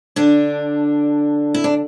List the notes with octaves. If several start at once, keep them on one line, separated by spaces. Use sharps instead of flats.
D3 D4
E4
D4